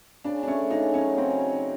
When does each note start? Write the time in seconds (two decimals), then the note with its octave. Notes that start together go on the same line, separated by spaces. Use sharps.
0.24 C#3 D4
0.43 D4
0.47 A3 C#4
0.70 C#3 D#4
0.94 F#3 C#4
1.17 C#3 C4